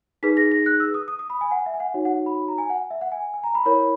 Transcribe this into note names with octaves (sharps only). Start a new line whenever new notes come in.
D#4 G#4 B4 B6
A#6
A#6
F#6
E6
D#6
D#6
D#6
B5
G#5
F#5
E5
G#5
F#5
D#4 F#4 C#5
F#5
B5
A#5
G#5
F#5
E5
F#5
G#5
G#5
A#5
B5
E4 A#4 C#5 B5